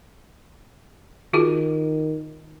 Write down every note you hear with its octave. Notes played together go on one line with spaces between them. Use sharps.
D#3 F4 F#4 G#4